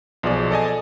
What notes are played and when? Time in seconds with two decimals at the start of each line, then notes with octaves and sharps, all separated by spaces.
0.23 B1 F3 G#4 D5
0.51 A4 D5 D#5 G#5